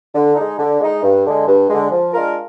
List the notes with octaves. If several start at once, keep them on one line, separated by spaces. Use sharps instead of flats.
D3
G#3 D#4
D3
G#3 D#4
G2
D3 G#3
G2
D3 G#3
F3
G#3 D4 F4 A#4